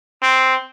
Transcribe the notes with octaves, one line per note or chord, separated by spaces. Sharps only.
C4